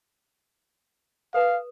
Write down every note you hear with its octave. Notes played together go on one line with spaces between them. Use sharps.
A4 B4 F5